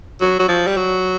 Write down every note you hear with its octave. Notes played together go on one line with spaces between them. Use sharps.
F#3
F#3
F3
G3
F#3